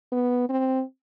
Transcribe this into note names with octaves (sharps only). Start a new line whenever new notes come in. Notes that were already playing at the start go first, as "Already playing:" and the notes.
B3
C4